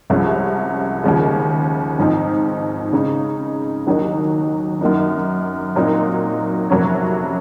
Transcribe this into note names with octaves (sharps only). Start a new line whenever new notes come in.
C2 C3 F3 G#3 C#4
D#2 C#3 F3 G#3
G#2 F3 C4 D#4
C#3 G#3 C4 D#4
D#2 D#3 F#3 A#3 D#4
F#2 D#3 A#3 D#4
A#2 F#3 C4 D#4
F2 C3 F#3 A#3 C#4